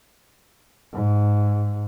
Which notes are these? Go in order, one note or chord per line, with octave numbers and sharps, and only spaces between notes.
G#2